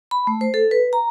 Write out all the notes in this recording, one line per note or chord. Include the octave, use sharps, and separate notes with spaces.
B5
A3
C5
A4
B4
A#5